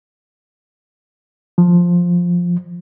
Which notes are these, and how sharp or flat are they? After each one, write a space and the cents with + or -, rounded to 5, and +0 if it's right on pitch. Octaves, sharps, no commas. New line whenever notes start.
F3 +5